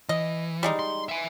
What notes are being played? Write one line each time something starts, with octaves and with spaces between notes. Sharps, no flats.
E3 D#5
G3 G#3 D#4
C6
E5 G#5